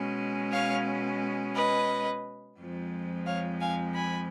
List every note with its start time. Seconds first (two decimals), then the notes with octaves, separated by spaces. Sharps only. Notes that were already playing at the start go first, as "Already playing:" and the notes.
Already playing: B2 G#3 C#4
0.52 C#5 F5
1.55 B4 D#5
2.58 F2 F3 G#3
3.26 C#5 F5
3.61 F5 G#5
3.95 G#5 B5